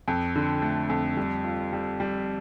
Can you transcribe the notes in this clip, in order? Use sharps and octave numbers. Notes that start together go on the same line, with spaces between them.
F2
D3
A3
F2
G3
F4
G3
G3